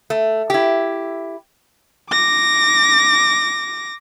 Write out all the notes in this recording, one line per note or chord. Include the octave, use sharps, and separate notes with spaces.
A3
E4 G4
D6 A#6